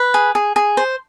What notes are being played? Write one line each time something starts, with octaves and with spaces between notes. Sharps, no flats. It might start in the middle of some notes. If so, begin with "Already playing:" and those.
Already playing: B4
G#4
G#4
G#4
C5